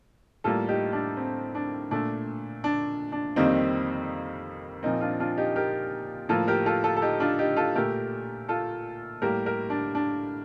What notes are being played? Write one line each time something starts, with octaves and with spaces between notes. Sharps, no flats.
A2 G3 A#3 F4 A4
D#4 G4
D4
C4
D4
A#2 A3 D4
D4
D4
F2 D#3 G3 A#3 C4 D#4
A#2 F3 A#3 C4 D#4
D4 F4
D4 F4
D#4 G4
G4 A#4
A2 F3 A#3 F4 A4
G4 A#4
F4 A4
F4 A4
A4
D#4 G4
D4 F4
D#4 G4
F4 A4
A#2 A3 G4 A#4
F4 A4
A2 G3 A#3 G4 A#4
G4 A#4
D4
D4